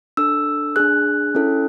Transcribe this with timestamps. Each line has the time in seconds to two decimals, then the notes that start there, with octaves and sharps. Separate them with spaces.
0.17 D4 A4 E6
0.76 D4 G#4 F#6
1.35 C#4 E4 A4